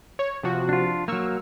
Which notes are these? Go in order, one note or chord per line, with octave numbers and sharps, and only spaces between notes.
C#5
C3 F3 F#4
D4 F4
F#3 A#3 C#6 E6 F6